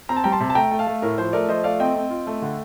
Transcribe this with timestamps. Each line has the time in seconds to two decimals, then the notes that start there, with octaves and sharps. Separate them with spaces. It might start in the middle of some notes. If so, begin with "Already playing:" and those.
0.09 C4 A#5
0.17 A5
0.24 G3 G5 A#5
0.32 A5 C6
0.40 C3
0.50 A5
0.55 A3 G5 A#5
0.71 A3
0.79 F5 A5
0.87 A3
1.02 A2 A#4
1.18 F3 C5
1.33 A3 A#4 D5
1.48 F3 C5 D#5
1.64 A3 D5 F5
1.80 C4 D#5 G5
1.95 C4
2.10 F4
2.27 A3
2.42 D3